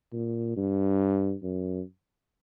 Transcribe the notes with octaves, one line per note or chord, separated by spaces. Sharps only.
A#2
G2
F#2